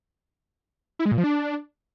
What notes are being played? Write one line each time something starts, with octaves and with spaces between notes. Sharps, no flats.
E4
G#3
A#2
F3
D4